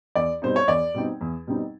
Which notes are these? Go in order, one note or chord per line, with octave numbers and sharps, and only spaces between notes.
E2 D5
B2 G3 C4 D#4 C5
C#5
E2 D5
B2 G3 C4 D#4
E2
B2 G3 C4 D#4